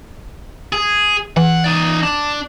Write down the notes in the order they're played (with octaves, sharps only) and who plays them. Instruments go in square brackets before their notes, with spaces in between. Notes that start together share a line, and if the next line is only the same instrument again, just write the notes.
[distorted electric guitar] G#4
[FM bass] E3 [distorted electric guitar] F#5
[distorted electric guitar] D#4 D5
D4